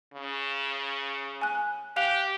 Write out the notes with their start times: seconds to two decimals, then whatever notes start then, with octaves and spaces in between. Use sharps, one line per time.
0.14 C#3
1.42 G#5 F#6
1.96 G4 F5 F#6 F7